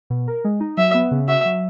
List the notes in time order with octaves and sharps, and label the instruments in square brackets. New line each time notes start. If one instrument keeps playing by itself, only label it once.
[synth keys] B2
A#4
G#3
D#4
[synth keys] F#3 [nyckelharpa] E5
[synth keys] B3
C#3
[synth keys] F#4 [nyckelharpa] E5
[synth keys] F#3